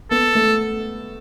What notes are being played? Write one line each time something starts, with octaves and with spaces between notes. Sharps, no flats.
B3 A4
A3